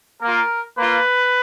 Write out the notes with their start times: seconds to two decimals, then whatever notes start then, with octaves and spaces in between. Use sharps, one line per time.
0.22 A#3 F4 A#4
0.78 A#3 F4 B4